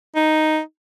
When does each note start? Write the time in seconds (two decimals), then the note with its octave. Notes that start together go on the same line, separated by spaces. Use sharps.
0.16 D#4